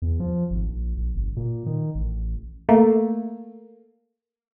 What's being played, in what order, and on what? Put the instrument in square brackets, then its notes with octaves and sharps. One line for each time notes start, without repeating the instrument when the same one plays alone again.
[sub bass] E2
F3
G#1
A#1
A#1
G1
A#2
D#3
A1
[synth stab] A3 A#3